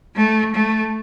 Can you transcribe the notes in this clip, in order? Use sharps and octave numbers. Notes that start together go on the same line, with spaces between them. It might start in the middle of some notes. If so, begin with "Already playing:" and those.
A3
A3